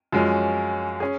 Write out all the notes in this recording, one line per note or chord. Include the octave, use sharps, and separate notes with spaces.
F#2 F3 G#3 C#4
C#4 G#4